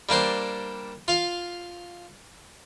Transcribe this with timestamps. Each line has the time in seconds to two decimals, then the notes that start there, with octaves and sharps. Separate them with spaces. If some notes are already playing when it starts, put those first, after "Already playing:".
0.09 G3 A#3 D4 C5
1.08 F4 F5